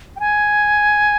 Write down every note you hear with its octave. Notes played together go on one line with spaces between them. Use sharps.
G5
G#5